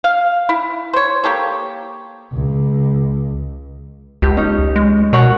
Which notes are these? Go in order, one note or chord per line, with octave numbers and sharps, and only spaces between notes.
F5
E4
C5 C#5
A#3 G4 A4 C#5
C#2
C#2 G4
C#4 D#4
G#3
B2 A#4 C#5 F#5